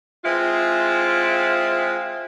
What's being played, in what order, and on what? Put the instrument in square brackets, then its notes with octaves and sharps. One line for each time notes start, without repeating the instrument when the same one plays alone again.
[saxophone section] G#3 C4 E4 F4